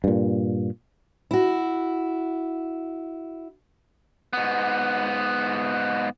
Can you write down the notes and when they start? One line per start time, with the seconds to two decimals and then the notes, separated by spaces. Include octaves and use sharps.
0.04 G2 A#2
1.31 E4 F#4
4.33 G#2 B3